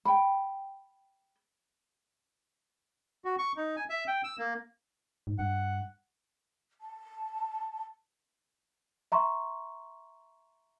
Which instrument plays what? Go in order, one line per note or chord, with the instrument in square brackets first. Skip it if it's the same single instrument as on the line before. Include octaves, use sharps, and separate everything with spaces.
[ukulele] G5 B5
[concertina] F#4
C#6
D#4
G#5
E5
G5
E6
A#3
[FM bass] G#2
[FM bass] G2 [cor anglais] F#5
[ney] A5
[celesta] E5 A#5 C6 C#6